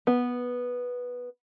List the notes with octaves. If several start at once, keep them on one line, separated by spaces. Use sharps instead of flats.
B3